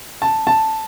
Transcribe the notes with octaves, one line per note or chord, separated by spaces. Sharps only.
A5
A5